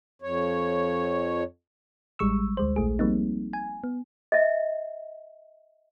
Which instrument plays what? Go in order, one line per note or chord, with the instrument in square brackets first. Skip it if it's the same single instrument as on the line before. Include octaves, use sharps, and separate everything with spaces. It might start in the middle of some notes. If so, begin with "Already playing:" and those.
[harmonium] F2 C#5
[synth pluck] A1 G3 G#3 C#6 E6
D2 G#3 C5
A#1 A3 G#4
F3 G3 A#3 C4 D#4
G#5
B3
[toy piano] D#5 E5